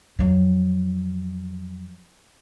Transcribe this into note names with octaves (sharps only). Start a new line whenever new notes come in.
F2 F#3